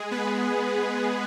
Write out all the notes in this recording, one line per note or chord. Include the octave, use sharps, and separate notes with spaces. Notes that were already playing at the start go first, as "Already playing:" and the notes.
Already playing: G#3 G#4
B3 B4